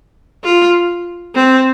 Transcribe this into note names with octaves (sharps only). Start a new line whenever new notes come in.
F4
C4